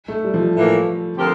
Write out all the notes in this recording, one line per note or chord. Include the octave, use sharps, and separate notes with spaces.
A3
G3
F3
G3
A2 E3 A#3
D3 F3 C4 G4 A#4